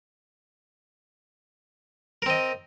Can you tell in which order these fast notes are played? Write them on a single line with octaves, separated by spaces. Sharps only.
A#4 C4 D#5